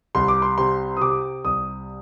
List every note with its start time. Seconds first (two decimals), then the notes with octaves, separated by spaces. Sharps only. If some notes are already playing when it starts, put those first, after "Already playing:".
0.15 C2 C6
0.28 D6
0.42 C6
0.58 C3 C6
0.97 D#6
1.01 C3 D6
1.44 C2 D#6